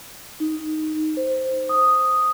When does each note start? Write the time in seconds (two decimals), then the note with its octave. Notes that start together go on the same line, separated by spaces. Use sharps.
0.40 D#4
1.17 C5
1.69 D#6